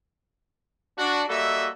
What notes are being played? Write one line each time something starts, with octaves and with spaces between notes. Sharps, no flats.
D4 F#4
G3 A#3 F#4 A4 D#5 E5